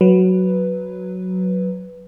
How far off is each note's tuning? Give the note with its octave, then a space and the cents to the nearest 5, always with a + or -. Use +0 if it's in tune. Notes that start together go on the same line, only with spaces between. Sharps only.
F#3 +0 B4 +0